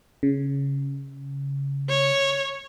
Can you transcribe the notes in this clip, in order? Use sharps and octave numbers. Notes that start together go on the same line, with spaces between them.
C#3
C#5